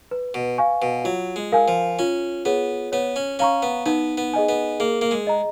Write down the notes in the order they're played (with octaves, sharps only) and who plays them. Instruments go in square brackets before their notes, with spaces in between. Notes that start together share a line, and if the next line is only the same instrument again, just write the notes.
[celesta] B4
[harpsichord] B2
[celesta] F5 G#5 C#6
[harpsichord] B2
[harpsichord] F#3 [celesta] F4
[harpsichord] G#3
[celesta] A#4 F5 G#5
[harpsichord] F3
[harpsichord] C#4 [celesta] F4
[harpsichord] B3 [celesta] G#4 C#5
[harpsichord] B3 [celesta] C#5
[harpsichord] C#4
[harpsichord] C#4 [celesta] F5 A#5 C#6
[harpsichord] B3
[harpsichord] B3 [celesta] D#4
[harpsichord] B3
[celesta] G#4 D#5 G#5
[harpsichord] B3
[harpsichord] A#3 [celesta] G#4
[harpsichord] A#3
G#3
[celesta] D#5 A#5